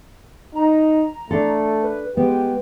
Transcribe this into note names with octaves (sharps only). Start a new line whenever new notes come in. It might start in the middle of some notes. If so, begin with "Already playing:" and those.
D#4 A#5
A3 D4 A4
B4
G#3 B3 G4